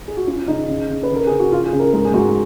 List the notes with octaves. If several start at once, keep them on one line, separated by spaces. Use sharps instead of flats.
G#4
F#4
C#4 F4
C#3 D#4
C#3
C#3
B4
C#3
A#4
C#3 G#4
F#4
C#3 F4
G#4
C#3
A#4
G#2 A#4
G#4
G#2 F#4